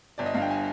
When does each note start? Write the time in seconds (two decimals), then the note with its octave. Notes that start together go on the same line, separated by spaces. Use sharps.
0.18 G1 D5
0.26 D#5
0.34 G2 F5
0.42 G5
0.50 G#5